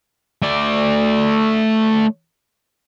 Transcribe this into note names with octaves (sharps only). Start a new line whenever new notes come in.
A3 D5